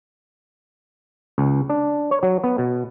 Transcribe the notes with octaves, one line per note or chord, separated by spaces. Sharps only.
C#2
D4
C#5
F#3
B3
B2